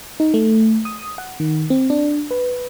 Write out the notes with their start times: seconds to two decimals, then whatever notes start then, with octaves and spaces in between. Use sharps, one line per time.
0.20 D#4
0.34 A3
0.85 D#6
1.18 F#5
1.40 D#3
1.70 C4
1.90 D4
2.31 B4